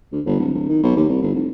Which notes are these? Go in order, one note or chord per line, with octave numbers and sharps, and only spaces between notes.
D2
G1
D1
D1
D#3
B1
D#2
C2
G1
F1